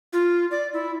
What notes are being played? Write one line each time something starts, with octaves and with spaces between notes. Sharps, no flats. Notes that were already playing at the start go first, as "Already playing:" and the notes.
F4
D5
E4